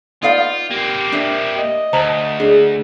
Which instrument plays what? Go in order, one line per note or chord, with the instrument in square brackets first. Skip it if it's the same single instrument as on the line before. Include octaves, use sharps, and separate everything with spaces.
[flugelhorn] B3 [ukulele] D#4 D5 F5 [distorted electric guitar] F4
[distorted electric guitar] A#3 C4 [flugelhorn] G4
[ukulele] D4 E5
[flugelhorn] D#5
[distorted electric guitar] D2 [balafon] C5 A5 A#5
[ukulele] D4 [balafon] G#4